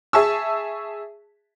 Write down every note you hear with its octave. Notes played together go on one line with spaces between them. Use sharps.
G#4 E5 A5 C#6 E6